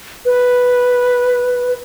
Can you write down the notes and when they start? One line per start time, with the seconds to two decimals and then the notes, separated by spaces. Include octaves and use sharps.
0.26 B4